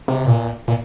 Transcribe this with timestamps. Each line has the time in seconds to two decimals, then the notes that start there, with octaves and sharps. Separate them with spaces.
0.08 C3
0.26 A#2
0.68 A#2